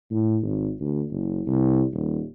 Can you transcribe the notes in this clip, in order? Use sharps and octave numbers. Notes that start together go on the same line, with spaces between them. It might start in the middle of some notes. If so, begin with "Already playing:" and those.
A2
G#1
D2
F#1
C2
D#1